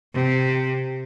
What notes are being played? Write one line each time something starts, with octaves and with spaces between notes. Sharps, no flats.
C3